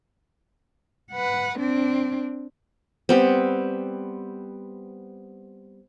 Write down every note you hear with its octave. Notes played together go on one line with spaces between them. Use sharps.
B4 F#5
C4 D4
G3 B3 C4